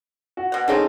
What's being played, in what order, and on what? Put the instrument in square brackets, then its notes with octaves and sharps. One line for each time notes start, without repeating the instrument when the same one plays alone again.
[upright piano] F#4
[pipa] B2 F#5
[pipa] A#3 C4 F4 [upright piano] C#4 D#4 A4 [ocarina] G#4